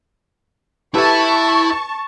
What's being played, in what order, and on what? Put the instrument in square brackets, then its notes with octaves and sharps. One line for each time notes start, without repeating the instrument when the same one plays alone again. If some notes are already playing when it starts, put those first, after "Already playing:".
[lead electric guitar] E4 E5 [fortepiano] G4 A4 B4 [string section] A5 C#6